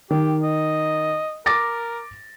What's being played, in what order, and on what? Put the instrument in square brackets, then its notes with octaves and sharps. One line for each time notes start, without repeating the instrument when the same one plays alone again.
[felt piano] D#3 [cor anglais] G4
[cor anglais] D#5
[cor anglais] A#4 [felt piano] D6 A6 A#6